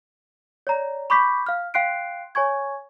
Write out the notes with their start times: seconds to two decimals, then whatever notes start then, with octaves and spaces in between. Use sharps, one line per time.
0.67 C#5 D5 A#5
1.10 B5 C#6 D6 G6 B6
1.46 F5 F6
1.74 F5 G5 C6 F#6 C7 D7
2.35 C#5 G#5 C#6 G#6